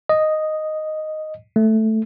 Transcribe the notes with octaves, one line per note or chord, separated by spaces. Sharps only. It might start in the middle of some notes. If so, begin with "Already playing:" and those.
D#5
A3